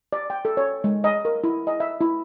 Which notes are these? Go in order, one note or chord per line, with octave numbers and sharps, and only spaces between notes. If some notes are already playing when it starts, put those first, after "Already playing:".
D5
G5
A4
C#5
G#3
D#5
A#4
E4
D#5
E5
E4